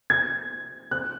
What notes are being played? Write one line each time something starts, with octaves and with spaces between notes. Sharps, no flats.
G#6
F#6